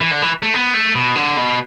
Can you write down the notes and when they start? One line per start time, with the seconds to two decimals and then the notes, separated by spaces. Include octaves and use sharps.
0.01 E3
0.11 D3
0.22 E3
0.43 A3
0.54 B3
0.74 A3
0.95 B2
1.16 D3
1.37 B2